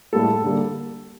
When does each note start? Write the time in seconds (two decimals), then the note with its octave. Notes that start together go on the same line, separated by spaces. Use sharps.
0.13 A2 G3 A#3 A4
0.44 D3 G3 A#3